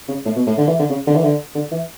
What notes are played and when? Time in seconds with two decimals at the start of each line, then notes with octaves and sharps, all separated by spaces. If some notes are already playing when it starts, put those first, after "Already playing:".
0.08 C#3
0.25 A2
0.36 B2
0.46 A2
0.58 D3
0.67 E3
0.79 D3
0.90 C#3
1.07 D3
1.15 E3
1.23 D3
1.55 D3
1.72 E3